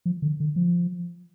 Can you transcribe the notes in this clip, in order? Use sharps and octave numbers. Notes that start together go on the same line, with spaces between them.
F3
D3
D3
F3